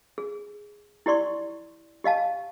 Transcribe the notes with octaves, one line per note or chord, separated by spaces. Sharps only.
G#4
E4 G4 D5 C6 C#6
G4 D#5 F5 A5